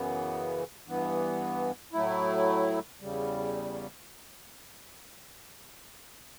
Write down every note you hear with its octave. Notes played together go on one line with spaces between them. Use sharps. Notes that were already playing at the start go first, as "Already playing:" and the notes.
Already playing: F#2 C#3 E3 B3
G2 E3 B3
A2 F#3 A3 E4
E2 C#3 G3